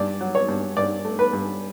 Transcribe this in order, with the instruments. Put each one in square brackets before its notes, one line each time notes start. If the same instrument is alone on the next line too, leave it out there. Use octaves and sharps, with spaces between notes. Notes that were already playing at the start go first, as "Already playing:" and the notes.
Already playing: [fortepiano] G2 D5
F#3
C#5
G2
G2 D5
A3
B4
G2